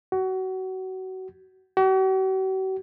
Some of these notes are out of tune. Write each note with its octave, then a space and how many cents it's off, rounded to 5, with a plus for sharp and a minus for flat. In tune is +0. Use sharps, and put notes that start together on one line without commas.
F#4 +25
F#4 +45